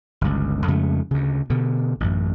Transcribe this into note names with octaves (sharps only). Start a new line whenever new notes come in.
G1 C#2
F2 C#3 G#3 A3
D2 C#3
B2 D3
A1 F#2